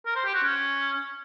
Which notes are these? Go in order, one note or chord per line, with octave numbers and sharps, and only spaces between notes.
A#4
C5
G4
F#4
C#4